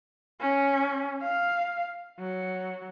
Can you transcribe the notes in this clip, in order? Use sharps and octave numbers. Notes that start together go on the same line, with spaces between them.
C#4
F5
F#3